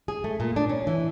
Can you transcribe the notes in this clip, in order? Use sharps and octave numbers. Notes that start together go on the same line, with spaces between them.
G#4
A3
A#2
D4
C#4
E3